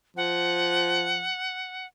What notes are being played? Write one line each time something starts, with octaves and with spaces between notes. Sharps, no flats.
F3 F#5